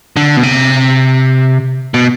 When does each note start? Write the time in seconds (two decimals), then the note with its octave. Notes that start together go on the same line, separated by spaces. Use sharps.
0.16 D3
0.37 B2
0.43 C3
1.94 B2